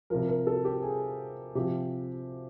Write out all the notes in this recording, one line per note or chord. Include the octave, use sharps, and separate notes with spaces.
C3 F3 A#4
A#4
A4
G4
G#4
C3 F3 G4